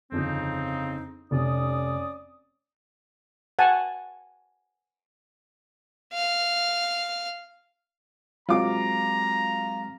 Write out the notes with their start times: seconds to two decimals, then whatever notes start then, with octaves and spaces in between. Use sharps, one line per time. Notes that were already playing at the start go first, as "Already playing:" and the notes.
0.12 G1 F2 C#3 C4 D#4
1.31 F1 C3 C#4 D5 D#6
3.59 F#5 G#5 A5
6.13 F5
8.49 F#3 G#3 C4 F4 A#5 D6